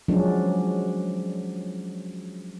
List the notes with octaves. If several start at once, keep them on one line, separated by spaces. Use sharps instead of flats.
F3 F#3 G#3 C#4 D4